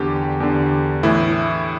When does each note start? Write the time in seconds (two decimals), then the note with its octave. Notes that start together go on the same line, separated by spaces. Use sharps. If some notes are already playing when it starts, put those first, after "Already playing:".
Already playing: E2 D3 G4
0.40 E2 D3
1.03 A2 E3 E4